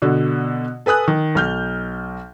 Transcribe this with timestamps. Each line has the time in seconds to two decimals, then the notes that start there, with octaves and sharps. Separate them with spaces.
0.02 B2 D3 F#4
0.86 A4 B4 G#5 D#6 F#6
1.08 D#3
1.35 B1 F6 G6